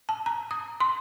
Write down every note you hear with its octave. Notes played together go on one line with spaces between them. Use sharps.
A5
A#5
D#6
C6